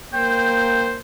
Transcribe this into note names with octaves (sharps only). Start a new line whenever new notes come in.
A#3 C5 G5